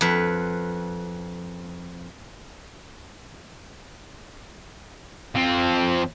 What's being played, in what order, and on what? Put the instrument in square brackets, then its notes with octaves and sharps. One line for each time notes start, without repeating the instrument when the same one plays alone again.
[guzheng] F2 B4
[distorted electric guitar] F3 C4